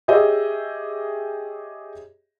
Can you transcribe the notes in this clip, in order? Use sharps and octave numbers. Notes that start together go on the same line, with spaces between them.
G4 G#4 C#5 D#5 E5